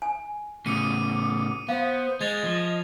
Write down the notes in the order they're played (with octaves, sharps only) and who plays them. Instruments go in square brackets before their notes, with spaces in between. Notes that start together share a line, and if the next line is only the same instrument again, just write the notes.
[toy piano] G#5
[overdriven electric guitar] A2 C#3 [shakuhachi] D6 [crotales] D#6 C#7 D#7
[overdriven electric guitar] B3 [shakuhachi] C5 [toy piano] F5
[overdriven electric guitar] G#3 [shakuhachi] D#5 [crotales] G#6 A6 F7
[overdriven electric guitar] F3